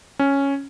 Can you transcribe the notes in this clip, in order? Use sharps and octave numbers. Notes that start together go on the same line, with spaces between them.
C#4